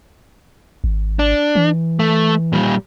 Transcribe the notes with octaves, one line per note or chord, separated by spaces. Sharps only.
G#1
D4
E3
A3
A#2 G3